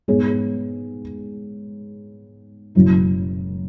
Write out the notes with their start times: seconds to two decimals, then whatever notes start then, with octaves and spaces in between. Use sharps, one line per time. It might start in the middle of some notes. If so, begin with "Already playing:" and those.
0.08 G#2 G#3 B3 G#4 C#5
2.75 F#1 F#2 F#3 E4